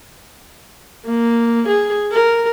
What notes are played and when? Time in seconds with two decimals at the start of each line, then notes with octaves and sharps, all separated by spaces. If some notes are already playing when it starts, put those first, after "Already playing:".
1.06 A#3
1.68 G#4
2.12 A#4